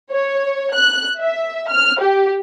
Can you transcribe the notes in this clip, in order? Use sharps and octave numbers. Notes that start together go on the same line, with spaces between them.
C#5
F#6
E5
F6
G4